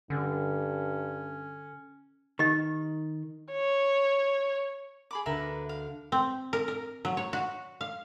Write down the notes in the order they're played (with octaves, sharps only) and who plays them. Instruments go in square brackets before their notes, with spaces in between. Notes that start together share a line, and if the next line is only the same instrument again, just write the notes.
[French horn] G2 [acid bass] D3 [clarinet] C#4
[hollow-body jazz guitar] D#3 [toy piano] G4 D#5
[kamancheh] C#5
[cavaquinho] G#4 B5 D6
[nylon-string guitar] D2 D3 [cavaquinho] A#4 B4 E5
[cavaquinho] F5
[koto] C4
A#4
A#4
F#3
C#5
F#4
F5